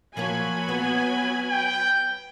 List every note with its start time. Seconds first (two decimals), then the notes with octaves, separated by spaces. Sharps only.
0.17 F3 F#3 A#3 C#5 G#5 B5
0.69 B3
1.51 G5